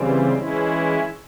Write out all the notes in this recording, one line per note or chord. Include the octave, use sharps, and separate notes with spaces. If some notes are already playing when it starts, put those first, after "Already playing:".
Already playing: C#3 E3 G3 C4
E3 G#3 C#4 E4